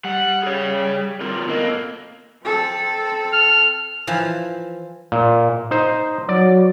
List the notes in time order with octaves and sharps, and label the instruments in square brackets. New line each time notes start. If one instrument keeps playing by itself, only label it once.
[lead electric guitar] G3 [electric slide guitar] F#5
[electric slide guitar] G#4 C#5
C4 F4 A#4
[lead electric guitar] A#3 [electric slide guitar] B3 A4 D#5
[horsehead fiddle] C4 A4
[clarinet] F6
[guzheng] E3 F3
[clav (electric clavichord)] A#2
D#4 C5
[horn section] F#3 [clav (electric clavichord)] D5